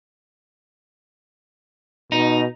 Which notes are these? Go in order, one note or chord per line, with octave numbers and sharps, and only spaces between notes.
B2 D#4